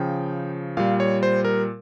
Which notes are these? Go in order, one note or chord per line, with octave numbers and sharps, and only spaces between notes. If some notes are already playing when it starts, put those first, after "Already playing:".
Already playing: C#3 F3 G5
A#2 G3 F5
C#5
C5
A#4